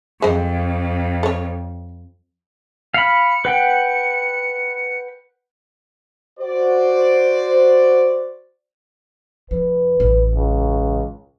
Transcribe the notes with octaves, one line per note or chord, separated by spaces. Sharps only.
F2 G#3 C5
A4 C#5
F5 B5 C#7
B4 F#5 G5
F#4 C5 D5
F1 F3 B4
A1 F#3
C#2